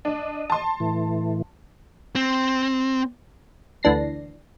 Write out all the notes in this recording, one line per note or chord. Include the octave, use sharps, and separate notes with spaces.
D4 D#5
A5 C6
A2 E3
C4
D2 E3 D4 A#6 C7